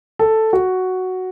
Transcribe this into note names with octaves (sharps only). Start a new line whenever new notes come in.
A4
F#4